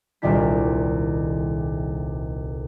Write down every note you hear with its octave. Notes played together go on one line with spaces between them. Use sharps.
D#1 C2 D#3 D4 E4 B6